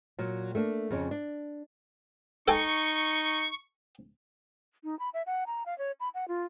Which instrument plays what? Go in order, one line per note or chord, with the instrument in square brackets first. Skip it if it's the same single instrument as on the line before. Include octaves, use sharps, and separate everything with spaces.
[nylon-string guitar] A#2 F#3
A3 A#3 D4
F2 C#3 C#4
D4
[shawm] D#4 [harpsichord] A4 G5 G#5 [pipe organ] C#6
[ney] D#4
B5
E5
F#5
A#5
F5
C#5
B5
F#5
F4